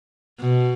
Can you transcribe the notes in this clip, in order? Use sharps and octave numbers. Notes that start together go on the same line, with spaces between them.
B2